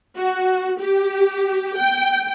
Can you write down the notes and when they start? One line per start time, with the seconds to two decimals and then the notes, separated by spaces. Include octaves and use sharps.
0.17 F#4
0.81 G4
1.77 G5